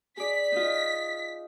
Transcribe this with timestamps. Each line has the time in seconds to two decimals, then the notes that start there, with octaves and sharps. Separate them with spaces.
0.17 G#4 D5 B6
0.52 D#4 F4